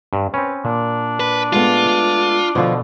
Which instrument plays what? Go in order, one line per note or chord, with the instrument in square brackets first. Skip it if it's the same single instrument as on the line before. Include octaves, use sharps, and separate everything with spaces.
[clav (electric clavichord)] G2
[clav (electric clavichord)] C4 C#4 [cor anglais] B4
[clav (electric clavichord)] A#2 [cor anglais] D4
[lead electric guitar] B4
[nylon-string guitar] G#3 A3 B3 [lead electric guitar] F4
[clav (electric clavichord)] B2 D3 [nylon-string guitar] F3 F4